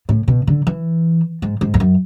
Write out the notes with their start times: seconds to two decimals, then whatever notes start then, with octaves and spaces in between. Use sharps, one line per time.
0.09 A2
0.28 B2
0.47 D3
0.67 E3
1.42 G#2
1.61 G#2
1.74 E2
1.80 F#2